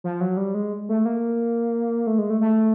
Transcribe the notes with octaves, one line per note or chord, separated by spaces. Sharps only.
F3
F#3
G3
G#3
A3
A#3
A3
G#3
A3
A3